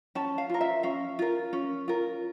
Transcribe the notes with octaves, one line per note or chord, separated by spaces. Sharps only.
C#4 A5
F5
F4 A#4
E5
C#4 F5
F4 A#4
C#4
F4 A#4